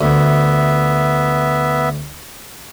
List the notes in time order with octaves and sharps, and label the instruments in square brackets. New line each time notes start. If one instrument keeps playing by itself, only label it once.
[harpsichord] D2 [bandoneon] B3 E5